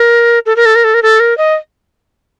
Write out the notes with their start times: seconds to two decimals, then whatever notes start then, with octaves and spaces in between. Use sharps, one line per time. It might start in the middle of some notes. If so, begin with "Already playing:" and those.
Already playing: A#4
0.46 A4
0.56 A#4
0.66 A4
0.75 A#4
0.84 A4
0.94 A#4
1.03 A4
1.20 A#4
1.38 D#5